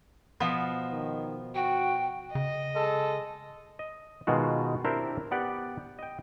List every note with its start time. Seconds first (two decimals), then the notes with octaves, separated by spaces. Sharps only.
0.40 B2 F3 B3
0.91 D#3
1.55 F#4 G5
2.35 C#3 D#5
2.75 G#3 A4
3.79 D#5
4.27 B2 D#3 G#3 F4 F#4
4.85 C4 D4 E4 G4 A#4 C5
5.31 B3 G4 D5 F#5
5.99 D#5 G5